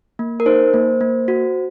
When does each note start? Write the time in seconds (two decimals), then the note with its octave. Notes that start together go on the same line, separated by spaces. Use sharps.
0.19 A#3
0.40 A#4
0.46 D#4 C5
0.74 A#3
1.01 A#3
1.28 F#4